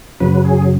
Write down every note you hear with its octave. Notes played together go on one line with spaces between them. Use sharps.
F#2 C#3 F#3 B4
G#4